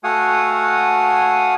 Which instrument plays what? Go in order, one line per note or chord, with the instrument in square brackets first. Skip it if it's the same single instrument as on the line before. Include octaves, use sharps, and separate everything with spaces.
[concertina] A3 F#4 F5 F#5 G#5 D#6